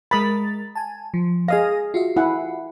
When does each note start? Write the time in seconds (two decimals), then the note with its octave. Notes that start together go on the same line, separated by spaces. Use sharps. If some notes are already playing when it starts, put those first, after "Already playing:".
0.11 G#3 A#4 B5 D#6 A6
0.75 G#5 A5
1.14 F3
1.48 G#4 D#5 F5 G#5 D#6 A#6
1.94 F4 F#4 E5
2.17 E4 F#5 G#5